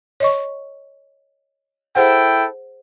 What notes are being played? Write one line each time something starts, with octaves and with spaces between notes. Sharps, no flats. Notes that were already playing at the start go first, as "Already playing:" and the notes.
C#5 D#5 C#6
E4 G#4 A4 C5 F#5 G5